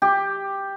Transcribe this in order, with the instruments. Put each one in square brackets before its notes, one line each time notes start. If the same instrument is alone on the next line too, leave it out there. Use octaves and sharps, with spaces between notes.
[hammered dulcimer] G4